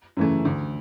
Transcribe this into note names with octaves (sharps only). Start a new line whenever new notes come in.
F#2 C#3 E3 A3
D2